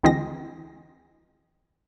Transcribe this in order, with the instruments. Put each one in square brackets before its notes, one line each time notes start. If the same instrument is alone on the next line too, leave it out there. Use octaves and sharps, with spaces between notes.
[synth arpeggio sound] D2 E3 G#3 C4 D#5 A#6